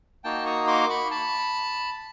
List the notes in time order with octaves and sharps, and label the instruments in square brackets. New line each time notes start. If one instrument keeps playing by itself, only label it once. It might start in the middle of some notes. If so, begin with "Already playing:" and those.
[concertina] A#3 D#4 F#4 G5 A5
C#6 D#6
C6 D6
B5 C#6
A5 B5